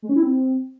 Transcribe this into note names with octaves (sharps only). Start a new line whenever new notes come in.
G#3
C#4
E4
C4